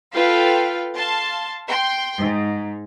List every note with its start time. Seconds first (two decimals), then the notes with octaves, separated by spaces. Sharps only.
0.14 F4 A4 B4 F5 G5
0.96 F5 A5 C6
1.67 G5 C6
2.18 G#2